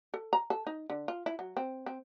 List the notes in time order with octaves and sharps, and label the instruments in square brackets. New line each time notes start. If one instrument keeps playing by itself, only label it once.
[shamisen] A4
A#5
A4
D#4
D3
F4
E4
F#3
C4
C4